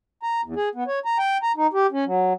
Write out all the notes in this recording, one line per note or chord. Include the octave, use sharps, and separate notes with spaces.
A#5
E2
G#4
B3
C#5
A#5
G5
A#5
D#4
G4
C#4
F#3